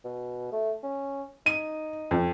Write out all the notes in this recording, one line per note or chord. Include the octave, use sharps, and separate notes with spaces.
B2
A3
C#4
D#4 D#7
F2